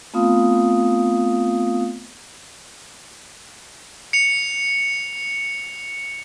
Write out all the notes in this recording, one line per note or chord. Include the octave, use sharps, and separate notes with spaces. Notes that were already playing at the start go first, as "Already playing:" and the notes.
A3 B3 C4 F4 F5 D#6
C#7 F7